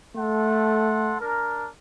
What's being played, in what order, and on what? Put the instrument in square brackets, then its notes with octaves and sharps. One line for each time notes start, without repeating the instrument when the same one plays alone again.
[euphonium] A3 [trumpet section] A4 F#5 C6
[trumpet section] D4 A#4